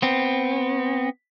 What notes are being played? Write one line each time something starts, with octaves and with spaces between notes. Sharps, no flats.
B3 C4